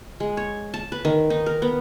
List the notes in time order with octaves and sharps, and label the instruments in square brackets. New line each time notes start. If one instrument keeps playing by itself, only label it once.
[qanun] G#3
C#5
A5
B4
D#3
D#4
A#4
B3